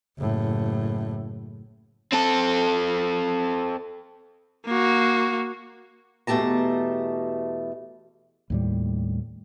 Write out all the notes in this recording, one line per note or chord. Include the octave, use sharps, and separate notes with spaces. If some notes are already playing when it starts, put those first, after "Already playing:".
F#1 A2
C4 A4
A#3 F#4
E2 B2 A3 G4 A5 A#5
D#2 A2 G3